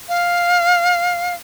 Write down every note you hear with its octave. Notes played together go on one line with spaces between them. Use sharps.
F5